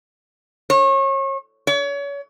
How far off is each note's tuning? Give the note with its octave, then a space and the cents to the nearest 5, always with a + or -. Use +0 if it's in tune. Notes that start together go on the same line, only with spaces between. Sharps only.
C#5 -35
C#5 +35